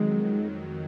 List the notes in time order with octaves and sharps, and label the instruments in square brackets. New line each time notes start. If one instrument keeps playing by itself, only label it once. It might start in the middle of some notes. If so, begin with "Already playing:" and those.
Already playing: [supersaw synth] F2 D#3 F#3 [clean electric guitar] G#3